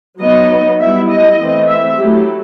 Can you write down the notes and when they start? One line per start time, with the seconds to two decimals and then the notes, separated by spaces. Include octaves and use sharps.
0.20 F#3 B3 D#4 D#5
0.79 G3 B3 E4 E5
1.10 D#5
1.40 E3 A3 C4
1.68 E5
1.98 F#3 A3 E4 G4